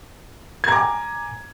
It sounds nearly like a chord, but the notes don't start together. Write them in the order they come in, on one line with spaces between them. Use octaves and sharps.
G#6 A#5 D6 G#5